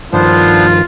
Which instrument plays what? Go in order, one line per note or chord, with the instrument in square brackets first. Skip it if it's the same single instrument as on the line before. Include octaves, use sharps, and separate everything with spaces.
[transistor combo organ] G2 D#3 F3 [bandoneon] B3 D4 C5 [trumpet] F4